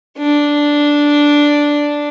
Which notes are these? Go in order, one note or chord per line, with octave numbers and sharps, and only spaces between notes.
D4